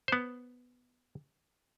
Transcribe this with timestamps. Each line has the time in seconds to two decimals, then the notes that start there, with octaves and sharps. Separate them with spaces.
0.08 B3 C5